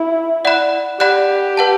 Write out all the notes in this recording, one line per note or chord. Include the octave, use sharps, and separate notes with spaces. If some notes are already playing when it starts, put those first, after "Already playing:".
Already playing: E4
D5 F#5 B5 F#6
G4 D5 F#5 B5 F#6
B4 F#5 A5